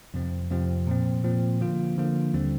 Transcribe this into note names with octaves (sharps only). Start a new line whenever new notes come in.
F2 C3 F3 C4
F2 C3 F3 C4
A#2 F3 C4
A#2 F3 C4
D3 F3 A#3 F4
D3 F3 A#3 F4
D#2 D3 G3 C4